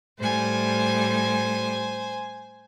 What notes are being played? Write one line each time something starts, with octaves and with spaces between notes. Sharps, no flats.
A2 G3 C5 G#5